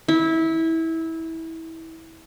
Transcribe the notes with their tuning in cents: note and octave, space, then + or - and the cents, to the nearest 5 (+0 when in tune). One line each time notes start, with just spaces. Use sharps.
E4 -20